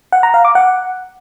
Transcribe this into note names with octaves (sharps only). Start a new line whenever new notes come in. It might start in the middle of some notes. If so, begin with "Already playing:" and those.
F#5
A#5
F5
D6
F#5